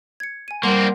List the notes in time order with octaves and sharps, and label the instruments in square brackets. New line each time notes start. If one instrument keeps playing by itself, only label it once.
[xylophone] G#6 C#7
G#5 D#7
[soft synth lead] G3 [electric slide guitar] A#3 C4 [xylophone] A#4 F#5 C6